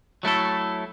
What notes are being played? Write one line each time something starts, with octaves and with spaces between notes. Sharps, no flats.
F#3 A3 E4 A4